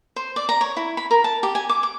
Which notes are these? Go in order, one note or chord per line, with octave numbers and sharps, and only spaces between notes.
C5
D5
A#5
C#5
E4
B5
A#4
A5
G4
G#5
D6
D6